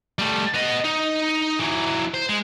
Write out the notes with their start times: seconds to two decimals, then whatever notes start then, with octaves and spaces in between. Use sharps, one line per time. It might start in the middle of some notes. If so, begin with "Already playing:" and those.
0.19 G3 A3
0.54 B3 D#5
0.85 D#4
1.59 E3 F#3
2.14 C5
2.29 G#3